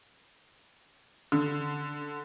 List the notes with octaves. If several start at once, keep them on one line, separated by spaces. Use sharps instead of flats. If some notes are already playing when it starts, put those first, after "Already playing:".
D3